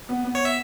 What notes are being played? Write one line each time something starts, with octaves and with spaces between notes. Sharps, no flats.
B3
B3
C#5
E5